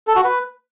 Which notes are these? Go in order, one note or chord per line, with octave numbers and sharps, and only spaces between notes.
A4
F#4
B4